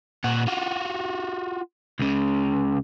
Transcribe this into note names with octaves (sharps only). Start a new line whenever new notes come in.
A#2 F#5
F4 F#4
C#2 C#3